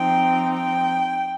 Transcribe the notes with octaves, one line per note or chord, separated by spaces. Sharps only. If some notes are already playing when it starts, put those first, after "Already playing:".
Already playing: F3 C4 D#4 G5
G5